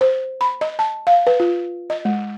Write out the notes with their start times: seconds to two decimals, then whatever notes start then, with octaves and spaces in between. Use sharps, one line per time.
0.01 C5
0.41 B5
0.61 D#5
0.79 A5
1.07 F5
1.27 B4
1.40 F4
1.90 D#5
2.05 G#3